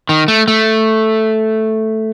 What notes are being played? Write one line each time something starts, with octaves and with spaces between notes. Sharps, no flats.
D#3
A3
A3